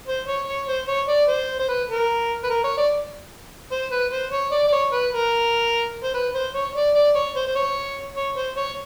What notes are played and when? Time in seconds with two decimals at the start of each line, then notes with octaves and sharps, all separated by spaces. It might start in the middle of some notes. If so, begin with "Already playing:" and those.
0.08 C5
0.28 C#5
0.48 C#5
0.68 C5
0.88 C#5
1.09 D5
1.29 C5
1.60 C5
1.69 B4
1.90 A#4
2.44 B4
2.50 A#4
2.64 C#5
2.78 D5
3.72 C5
3.92 B4
4.12 C5
4.32 C#5
4.52 D5
4.68 D5
4.73 C#5
4.92 B4
5.13 A#4
6.04 C5
6.14 B4
6.35 C5
6.54 C#5
6.75 D5
6.95 D5
7.16 C#5
7.36 C5
7.48 C5
7.56 C#5
8.17 C#5
8.37 C5
8.57 C#5